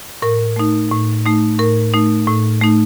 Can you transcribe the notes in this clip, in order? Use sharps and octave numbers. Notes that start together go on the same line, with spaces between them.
A2 A#4
A3 D#4
A2
A3 D#4
A2 A#4
A3 D#4
A2
A3 D#4